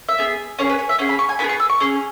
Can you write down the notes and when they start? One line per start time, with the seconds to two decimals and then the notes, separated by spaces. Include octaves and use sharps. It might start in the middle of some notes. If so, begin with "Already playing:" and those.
0.09 E5
0.18 B3 G#4
0.59 C#4 G#4 C#5
0.69 B4
0.79 C#5
0.89 E5
0.99 C#4 G#4 F#5
1.09 B5
1.19 C#6
1.29 G#5
1.39 B3 E4 G#4 B5
1.49 C#6
1.60 E6
1.70 C#6
1.80 C#4 G#4